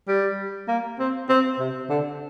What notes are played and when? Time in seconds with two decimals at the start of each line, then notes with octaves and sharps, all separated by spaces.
0.08 G3
0.68 A#3
0.99 C4
1.29 C4
1.59 C3
1.90 D3